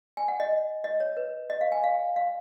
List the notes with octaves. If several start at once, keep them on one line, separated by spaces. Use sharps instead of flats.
G#5
F#5
D#5
D#5
C#5
B4
D#5
F5
G#5
F5
F5